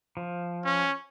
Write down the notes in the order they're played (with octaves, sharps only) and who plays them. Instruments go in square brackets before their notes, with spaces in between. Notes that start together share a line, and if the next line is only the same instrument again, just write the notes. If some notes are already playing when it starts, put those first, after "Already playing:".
[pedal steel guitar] F3
[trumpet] C#4